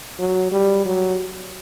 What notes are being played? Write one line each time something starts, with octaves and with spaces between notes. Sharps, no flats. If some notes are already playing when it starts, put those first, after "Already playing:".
F#3
G3
F#3